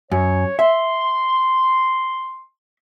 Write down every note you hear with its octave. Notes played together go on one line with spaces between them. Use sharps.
F#2 C#5
E5 C6